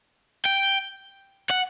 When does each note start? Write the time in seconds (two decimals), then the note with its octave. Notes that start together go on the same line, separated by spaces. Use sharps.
0.45 G5
1.50 F#5